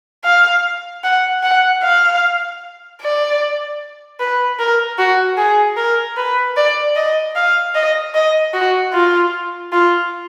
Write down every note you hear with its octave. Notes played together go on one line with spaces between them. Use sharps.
F5
F#5
F#5
F5
D5
B4
A#4
F#4
G#4
A#4
B4
D5
D#5
F5
D#5
D#5
F#4
F4
F4